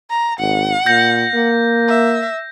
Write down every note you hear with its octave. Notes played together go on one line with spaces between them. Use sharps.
A#5
G#1 F#5
A#2 G6 A#6
A#3
E5